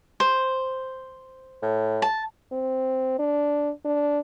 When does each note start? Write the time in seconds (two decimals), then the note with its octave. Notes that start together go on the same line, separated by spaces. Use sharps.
0.20 C5
1.62 A2
2.02 A5
2.52 C4
3.19 D4
3.85 D4